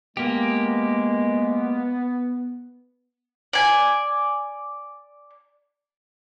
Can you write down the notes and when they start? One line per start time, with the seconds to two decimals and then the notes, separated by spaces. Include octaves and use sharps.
0.17 G#3 A#3 B3 G4
3.53 D5 G#5